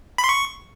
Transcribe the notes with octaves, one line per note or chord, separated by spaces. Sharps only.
B5
C6
C#6